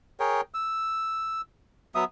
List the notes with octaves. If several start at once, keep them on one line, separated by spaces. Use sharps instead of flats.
G#4 A#4 C#5 G5
E6
F#3 B3 E5 D#6